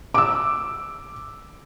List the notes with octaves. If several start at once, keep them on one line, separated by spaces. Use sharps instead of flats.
D6 E6